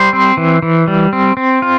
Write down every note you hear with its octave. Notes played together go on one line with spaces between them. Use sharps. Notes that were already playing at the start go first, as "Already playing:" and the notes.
Already playing: G3 C5
C4
E3
E3
G3
C4
C4
F4